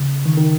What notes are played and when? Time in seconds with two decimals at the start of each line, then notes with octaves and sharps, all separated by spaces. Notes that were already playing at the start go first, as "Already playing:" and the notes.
Already playing: C#3
0.26 D#3
0.37 D#3